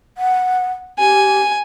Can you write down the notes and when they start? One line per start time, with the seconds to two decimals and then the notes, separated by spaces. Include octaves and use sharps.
0.17 F#5
0.99 G4 G#5